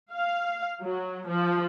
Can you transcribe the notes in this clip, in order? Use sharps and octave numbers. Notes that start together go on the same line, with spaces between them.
F5
F#3
F3